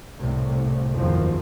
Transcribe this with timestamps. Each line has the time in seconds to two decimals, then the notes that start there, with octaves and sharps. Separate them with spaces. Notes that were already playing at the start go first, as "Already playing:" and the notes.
0.17 C2 A2 C3
0.96 F#1 B1 E2 G#2 D#3 F3